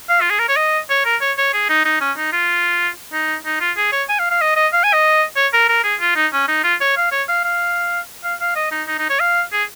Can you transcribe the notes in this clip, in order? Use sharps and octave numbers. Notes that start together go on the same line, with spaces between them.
F5
F4
G#4
A#4
C#5
D#5
C#5
A#4
C#5
C#5
G#4
D#4
D#4
C#4
D#4
F4
D#4
D#4
F4
G#4
C#5
G#5
F5
F5
D#5
D#5
F5
G#5
D#5
C#5
A#4
A#4
G#4
F4
D#4
C#4
D#4
F4
C#5
F5
C#5
F5
F5
F5
F5
D#5
D#4
D#4
D#4
C#5
F5
G#4